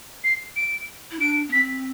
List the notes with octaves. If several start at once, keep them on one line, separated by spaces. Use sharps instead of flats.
C7
D7
E4
D4 D7
B3
C4 B6